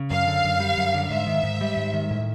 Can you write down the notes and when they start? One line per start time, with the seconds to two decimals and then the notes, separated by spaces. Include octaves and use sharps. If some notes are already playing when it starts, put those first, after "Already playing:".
Already playing: C#3
0.10 F#2 F5
0.27 D3
0.44 F#2
0.60 G3
0.77 F#2
0.94 D3
1.10 G#2 E5
1.27 D#3
1.43 G#2
1.61 G3
1.77 G#2
1.93 D#3
2.11 A2